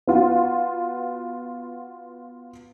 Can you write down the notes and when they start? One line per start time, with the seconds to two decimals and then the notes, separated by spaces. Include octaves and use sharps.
0.07 B3 F4 F#4